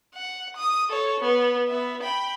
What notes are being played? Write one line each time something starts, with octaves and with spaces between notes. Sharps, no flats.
F#5
D#6
A4 C#5
B3
B3 E5
G5 B5